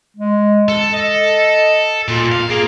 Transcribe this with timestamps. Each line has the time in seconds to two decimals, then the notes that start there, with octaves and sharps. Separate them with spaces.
0.17 G#3
0.68 A4
0.93 D#5
2.08 A#2 F4
2.32 F5
2.50 A#3 G#4